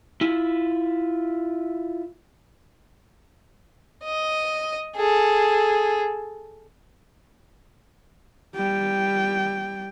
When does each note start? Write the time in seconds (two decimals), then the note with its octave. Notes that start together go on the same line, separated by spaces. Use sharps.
0.21 E4 F4
4.03 D#5
4.96 G#4 A4
8.55 G3 G5